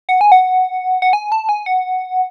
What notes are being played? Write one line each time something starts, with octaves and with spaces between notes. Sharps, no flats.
F#5
G#5
F#5
F#5
G#5
A5
G#5
F#5